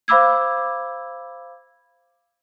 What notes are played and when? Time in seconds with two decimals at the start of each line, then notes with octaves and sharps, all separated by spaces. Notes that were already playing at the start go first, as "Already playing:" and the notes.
0.08 C5 F5 B5 D6 E6 G#6